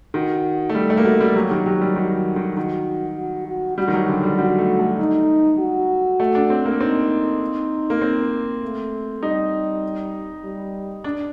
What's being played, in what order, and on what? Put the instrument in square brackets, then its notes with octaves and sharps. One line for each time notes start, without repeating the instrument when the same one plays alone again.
[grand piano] D#3 [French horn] F#4
[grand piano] A3
[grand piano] G3 [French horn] G4
[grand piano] A3
A#3
[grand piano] A3 [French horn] F#4
[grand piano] G3
[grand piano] F#3 [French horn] G4
[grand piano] D#3
[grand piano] F#3 [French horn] G4
[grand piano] G3
[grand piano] D#3 [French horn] F#4
[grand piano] D#3
[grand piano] D#3 [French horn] F#4
[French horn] F#4
F#4
[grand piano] G3 [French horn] F#4
[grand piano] D#3
F#3
[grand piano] D3 [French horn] G4
[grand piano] G3
[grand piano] G3 [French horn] F#4
[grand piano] A3
A3
[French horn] D#4
F#4
[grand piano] A3
D4
C4
A#3
[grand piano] C4 [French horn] D#4
[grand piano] A#3
C4
[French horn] A3
[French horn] G3 [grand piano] D#4
[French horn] G3
[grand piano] D4